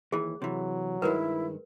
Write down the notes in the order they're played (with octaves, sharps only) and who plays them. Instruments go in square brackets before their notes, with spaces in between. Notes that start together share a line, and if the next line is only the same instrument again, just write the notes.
[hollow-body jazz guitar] D#2 E3 [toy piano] G#4
[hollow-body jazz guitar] C3 E3 [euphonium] F#3
[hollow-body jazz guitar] G2 D#3 G#3 [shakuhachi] E4 [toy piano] A#4 B4